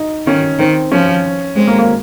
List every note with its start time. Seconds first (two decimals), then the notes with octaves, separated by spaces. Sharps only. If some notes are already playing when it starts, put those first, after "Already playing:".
Already playing: D#4
0.26 D#3 C#4
0.59 D#3 C4
0.92 F3 C#4
1.56 G#3 C4
1.67 A#3
1.79 A#3